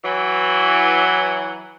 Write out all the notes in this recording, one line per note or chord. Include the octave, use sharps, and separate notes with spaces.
E3 F#3